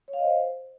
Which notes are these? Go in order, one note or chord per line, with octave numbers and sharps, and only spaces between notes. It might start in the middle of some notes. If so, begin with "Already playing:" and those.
C#5
F5
D#5
C5